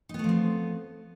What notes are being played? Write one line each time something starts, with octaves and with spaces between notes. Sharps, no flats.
F3 A3 B3 C4 D#4